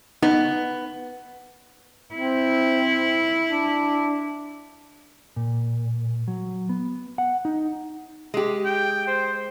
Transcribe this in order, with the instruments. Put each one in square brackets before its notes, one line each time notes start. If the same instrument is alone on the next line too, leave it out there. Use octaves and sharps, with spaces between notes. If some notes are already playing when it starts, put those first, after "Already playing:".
[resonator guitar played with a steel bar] B3 [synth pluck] D#4
[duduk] C4 [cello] E4
[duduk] D4
[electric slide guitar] A#2
F#3
B3
F#5
D#4
[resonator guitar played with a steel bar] G#3 G4
[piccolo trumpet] G5
C5